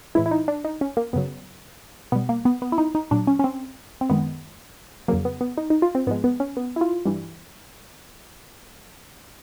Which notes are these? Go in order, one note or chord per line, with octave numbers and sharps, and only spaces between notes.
A2 E3 G#3 E4
E4
D#4
D4
D#4
C#4
A#3
F#2 C#3 F#3 B3
B2 G3 B3
A#3
B3
B3
E4
D#4
D#4
A#2 F#3 D4
C#4
C#4
C4
C4
F#2 D#3 G#3 B3
F2 C#3 F#3 A#3
B3
B3
D#4
D#4
F4
C4
G#2 F3 G#3 B3
B3
C#4
B3
E4
F4
G2 E3 G3